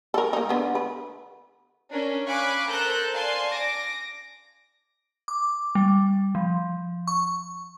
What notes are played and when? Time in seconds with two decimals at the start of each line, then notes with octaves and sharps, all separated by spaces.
0.14 A4 A#4
0.33 A#3 D#4
0.49 D3 B3
0.75 B4
1.91 C#4 D4 A#4
2.27 F5 G#5 B5 C#6 D6 F#6
2.69 A4 A#4 C5 A#5 F#6 G6
3.13 D5 F5 G#5 A5 C6
3.51 D6 A#6
5.28 D6
5.75 G3
6.35 F3
7.07 C#6